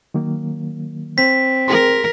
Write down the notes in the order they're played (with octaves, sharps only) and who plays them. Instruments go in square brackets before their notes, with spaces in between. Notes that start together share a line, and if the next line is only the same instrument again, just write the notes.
[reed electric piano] D#3 F#3 A#3
[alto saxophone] C4 [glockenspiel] B6
[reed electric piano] G#4 C6 [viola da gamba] A#4